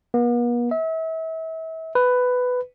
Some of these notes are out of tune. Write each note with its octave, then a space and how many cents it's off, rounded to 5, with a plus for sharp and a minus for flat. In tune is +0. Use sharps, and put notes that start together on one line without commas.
B3 -45
E5 -35
B4 +10